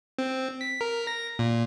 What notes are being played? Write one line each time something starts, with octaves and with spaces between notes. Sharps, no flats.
C4
B6
A#4
A#6
A#2